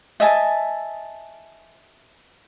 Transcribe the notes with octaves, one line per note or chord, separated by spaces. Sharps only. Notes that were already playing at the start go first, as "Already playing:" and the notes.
D#5 E5 G#5 A5